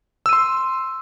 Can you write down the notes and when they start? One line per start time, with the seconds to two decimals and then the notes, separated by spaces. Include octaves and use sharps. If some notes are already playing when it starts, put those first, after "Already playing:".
0.26 E6
0.29 D#7
0.33 C6